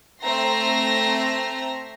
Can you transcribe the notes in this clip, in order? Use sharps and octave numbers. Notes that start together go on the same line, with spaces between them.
A3 C4 E5 A#5 C6 A#6